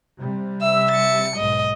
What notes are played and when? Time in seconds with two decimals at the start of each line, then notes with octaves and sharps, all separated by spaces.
0.18 C3 G3
0.62 E5 E6
0.91 A6 C#7
1.36 B1 G#2 D#5